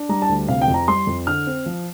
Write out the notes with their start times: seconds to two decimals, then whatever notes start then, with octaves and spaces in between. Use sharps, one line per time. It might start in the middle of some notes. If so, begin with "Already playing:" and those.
Already playing: D4
0.09 G3 A#5
0.22 A5
0.29 D2
0.48 C3 F5
0.62 G5
0.68 F2
0.74 A#5
0.88 G3 C6
1.07 F2
1.27 D3 F6
1.47 C4
1.66 F3